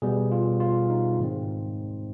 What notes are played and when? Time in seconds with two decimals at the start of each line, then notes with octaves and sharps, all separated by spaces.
0.02 B2 G3 B3 G#4
0.32 F4
0.60 F4
0.90 D#4
1.20 G#2 D#3 G#3 C4